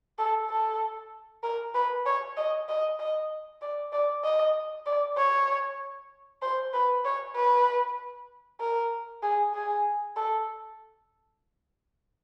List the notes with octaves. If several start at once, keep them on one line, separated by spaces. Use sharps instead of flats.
A4
A4
A#4
B4
C#5
D#5
D#5
D#5
D5
D5
D#5
D5
C#5
C5
B4
C#5
B4
A#4
G#4
G#4
A4